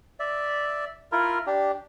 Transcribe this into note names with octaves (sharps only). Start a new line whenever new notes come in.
D5 E5
E4 F4 A#4
D4 G4